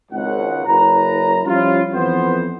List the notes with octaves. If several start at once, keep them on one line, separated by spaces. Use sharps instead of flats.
G#1 C#2 F#5
F#1 F#2 E4 B4 A#5
F3 G3 C#4 E4 F4
F2 E3 B3 C5